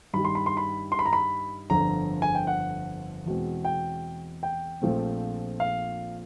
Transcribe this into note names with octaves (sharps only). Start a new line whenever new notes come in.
G2 D#3 G3 B5
C6
B5
C6
B5
C6
B5
A#5
B5
G1 F2 D3 A#5
G#5
G5
F#5
E2 B2 G#3 C4
G5
G5
A#1 A#2 F3 A3 C4
F5